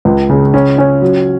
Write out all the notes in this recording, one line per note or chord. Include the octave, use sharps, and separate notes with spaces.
C#2
C#3
C#4
C#4
F#3